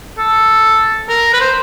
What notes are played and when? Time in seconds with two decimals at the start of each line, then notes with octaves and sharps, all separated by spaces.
0.18 A4
1.09 A#4
1.33 B4
1.40 C5